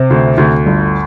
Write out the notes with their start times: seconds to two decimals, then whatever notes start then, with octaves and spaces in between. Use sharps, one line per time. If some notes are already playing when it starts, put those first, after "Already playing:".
Already playing: C3 C5
0.11 D2
0.38 D2
0.66 G1